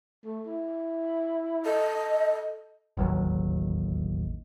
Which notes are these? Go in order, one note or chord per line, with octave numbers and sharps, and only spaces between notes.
A3
E4
A4 D#5
E1 A1 D#2 F#3